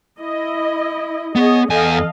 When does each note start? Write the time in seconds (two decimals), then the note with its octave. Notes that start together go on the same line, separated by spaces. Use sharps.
0.19 E4 D#5
1.36 B3 G#4 C#5 D#5
1.70 E2 A4 D#5 F5 G#5